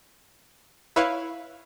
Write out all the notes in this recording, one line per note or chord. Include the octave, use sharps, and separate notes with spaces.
E4 B4 C#5 F5